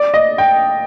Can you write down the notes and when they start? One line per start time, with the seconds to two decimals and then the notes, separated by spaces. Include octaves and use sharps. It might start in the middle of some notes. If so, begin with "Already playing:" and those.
Already playing: D5
0.14 D#5
0.38 G5